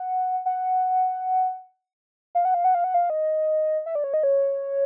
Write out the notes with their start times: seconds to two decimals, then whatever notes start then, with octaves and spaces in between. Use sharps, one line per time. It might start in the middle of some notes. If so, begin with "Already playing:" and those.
Already playing: F#5
0.46 F#5
2.35 F5
2.45 F#5
2.54 F5
2.64 F#5
2.75 F5
2.84 F#5
2.94 F5
3.10 D#5
3.86 E5
3.95 D5
4.04 C#5
4.14 D#5
4.23 C#5